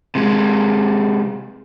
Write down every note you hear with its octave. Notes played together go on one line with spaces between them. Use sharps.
C3 G#3